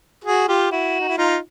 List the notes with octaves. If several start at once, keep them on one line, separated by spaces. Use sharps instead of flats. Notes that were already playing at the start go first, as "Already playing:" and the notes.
F#4 G#4
F4 G4
E4 F#4
D#4
E4
D#4 F4